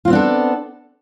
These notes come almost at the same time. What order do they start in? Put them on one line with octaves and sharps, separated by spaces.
F4 C4 B3 D4 A4